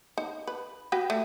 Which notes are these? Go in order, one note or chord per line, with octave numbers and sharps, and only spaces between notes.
D#4
B4
F#4 B4 G5
A3